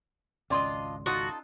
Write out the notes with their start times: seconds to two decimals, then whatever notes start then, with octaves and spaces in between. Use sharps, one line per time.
0.50 G#1 C#2 C#4 D4 F4 D5 D#5 C6
1.06 D#4 F4 F#4 A4